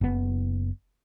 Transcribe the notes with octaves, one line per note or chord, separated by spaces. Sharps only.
F#1 B3